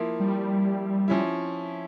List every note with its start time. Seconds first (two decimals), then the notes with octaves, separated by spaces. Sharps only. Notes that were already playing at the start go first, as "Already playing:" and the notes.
Already playing: F3 A#3 E4
0.20 G3
1.08 F3 C#4 E4